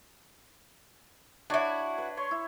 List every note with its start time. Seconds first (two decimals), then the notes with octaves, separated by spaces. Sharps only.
1.50 D4 E4 F#4 C#5
1.98 B4
2.17 C#5 C6 C#6
2.31 E4